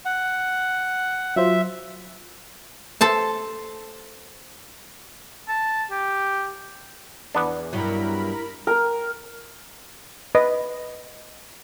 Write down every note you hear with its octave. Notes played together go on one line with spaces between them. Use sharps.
F#5
F#3 F4 C5 E5
A4 C5 A5
A5
G4
E2 B3 D4
G2 B2 F#3 E4 A#4 B5
A#4
B4 D#5